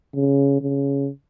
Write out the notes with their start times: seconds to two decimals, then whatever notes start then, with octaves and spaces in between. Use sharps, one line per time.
0.15 C#3
0.61 C#3